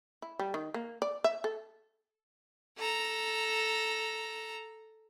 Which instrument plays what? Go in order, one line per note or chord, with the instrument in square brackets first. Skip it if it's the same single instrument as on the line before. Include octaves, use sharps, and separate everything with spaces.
[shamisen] E4
G3
D#3
A#3
D5
E5
A4
[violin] A4 A#5